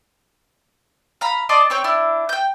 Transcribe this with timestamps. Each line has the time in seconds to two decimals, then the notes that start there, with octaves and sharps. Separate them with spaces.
1.21 F5 A#5 B5
1.49 D5 D#5 A5 C6
1.70 C4 C#5 G5
1.84 D4 E4
2.29 G5 G6